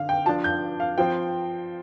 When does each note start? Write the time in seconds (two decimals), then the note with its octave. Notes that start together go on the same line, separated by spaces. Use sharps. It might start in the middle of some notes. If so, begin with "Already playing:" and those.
Already playing: D3 F5
0.09 G5
0.26 F3 D4 A5
0.44 G6
0.80 F5
0.98 F3 C4 G5